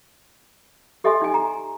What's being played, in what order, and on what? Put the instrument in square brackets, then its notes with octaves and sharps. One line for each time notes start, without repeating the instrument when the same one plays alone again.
[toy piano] G4 A4 D#5 E5 G#5 C6
D#4 G#5
A#5